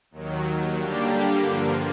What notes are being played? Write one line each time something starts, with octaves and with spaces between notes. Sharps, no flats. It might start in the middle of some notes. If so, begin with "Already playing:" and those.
D#2 D#3 F#3
D3 G3 A#3 D4 G4
G2 D3 F3 A#3